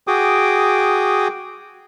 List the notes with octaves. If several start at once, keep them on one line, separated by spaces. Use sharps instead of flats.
F#4 G#4 G5 D6 D#6